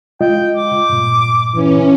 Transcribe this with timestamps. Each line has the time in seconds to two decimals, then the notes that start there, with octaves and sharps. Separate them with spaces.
0.21 G#3 F4 D#5 G5
0.56 D6
0.89 G2 A#2
1.55 E3 C#4